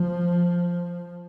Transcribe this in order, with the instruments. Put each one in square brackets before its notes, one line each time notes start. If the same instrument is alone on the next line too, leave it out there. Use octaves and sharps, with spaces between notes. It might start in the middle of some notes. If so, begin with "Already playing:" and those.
Already playing: [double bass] F3